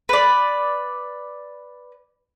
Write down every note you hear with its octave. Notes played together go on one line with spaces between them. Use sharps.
B4 D5